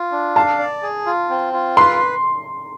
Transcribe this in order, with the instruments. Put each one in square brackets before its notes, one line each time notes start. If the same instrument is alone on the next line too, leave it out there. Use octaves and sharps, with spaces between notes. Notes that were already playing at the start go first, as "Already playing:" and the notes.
Already playing: [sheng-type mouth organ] F4
D4
[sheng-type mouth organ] F5 [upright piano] A5
[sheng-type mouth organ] D5
G#4
F4
C4
F4
[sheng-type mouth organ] B4 [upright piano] C6